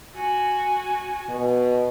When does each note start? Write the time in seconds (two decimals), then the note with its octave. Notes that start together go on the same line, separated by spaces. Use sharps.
0.15 F#4 G#5
1.30 B2